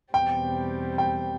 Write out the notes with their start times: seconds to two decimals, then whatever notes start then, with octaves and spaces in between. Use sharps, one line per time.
0.14 E2 B2 G3 C4 G5
0.98 G5